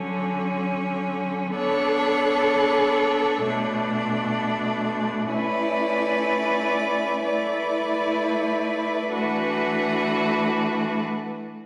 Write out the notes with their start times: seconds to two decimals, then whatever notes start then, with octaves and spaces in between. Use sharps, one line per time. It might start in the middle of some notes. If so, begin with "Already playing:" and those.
Already playing: D3 F#3 C#4
1.54 B3 D4 A4 C#5
3.44 B2 A3 D4
5.33 A3 C#4 E4 B4 D5
7.23 A3 E4 B4 D5
9.13 E3 A3 D4 F#4 B4